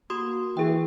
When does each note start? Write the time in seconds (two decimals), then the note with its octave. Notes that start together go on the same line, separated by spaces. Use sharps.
0.10 A#3 F#4 C6 D#6
0.57 E3 G#4 G5